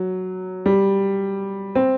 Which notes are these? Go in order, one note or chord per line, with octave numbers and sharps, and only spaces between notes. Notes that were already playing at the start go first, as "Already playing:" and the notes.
Already playing: F#3
G3
C4